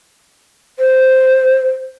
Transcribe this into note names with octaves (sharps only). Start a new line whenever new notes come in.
C5